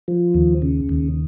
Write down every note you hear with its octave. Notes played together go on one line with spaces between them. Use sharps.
F3
D#2
C#3
D#2